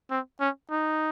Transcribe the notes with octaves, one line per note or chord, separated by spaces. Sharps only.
C4
C#4
D#4